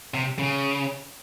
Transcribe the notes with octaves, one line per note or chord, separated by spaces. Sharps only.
C3
C#3